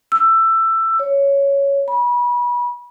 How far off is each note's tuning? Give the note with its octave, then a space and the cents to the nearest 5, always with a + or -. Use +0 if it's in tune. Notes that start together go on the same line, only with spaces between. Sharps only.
E6 +15
C#5 +5
B5 -30